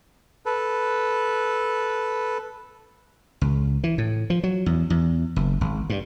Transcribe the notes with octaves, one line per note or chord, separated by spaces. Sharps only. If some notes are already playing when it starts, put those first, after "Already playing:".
A4 B4
C#2
E3
A2
F3
F#3
E2
E2
F#1
G#1
G2